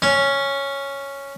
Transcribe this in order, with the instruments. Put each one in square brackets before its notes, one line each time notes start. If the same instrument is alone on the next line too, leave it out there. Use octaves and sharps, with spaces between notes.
[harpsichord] C#4